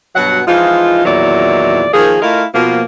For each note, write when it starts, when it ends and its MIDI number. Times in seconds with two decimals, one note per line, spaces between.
0.15 0.41 43
0.15 0.41 47
0.15 0.41 54
0.15 0.41 78
0.47 1.05 52
0.47 1.05 53
0.47 1.05 56
0.47 1.05 63
0.47 1.05 65
1.05 1.87 40
1.05 1.87 46
1.05 1.87 51
1.05 1.87 54
1.05 1.87 64
1.05 1.87 74
1.93 2.17 51
1.93 2.17 53
1.93 2.17 58
1.93 2.17 68
2.22 2.44 57
2.22 2.44 64
2.22 2.44 65
2.22 2.44 70
2.22 2.44 75
2.22 2.44 77
2.54 2.81 47
2.54 2.81 53
2.54 2.81 58